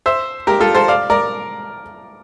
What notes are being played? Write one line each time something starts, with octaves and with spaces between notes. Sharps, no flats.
C5 E5
G4 A#4
F4 A4
A4 C5
D5 F5
A#4 D5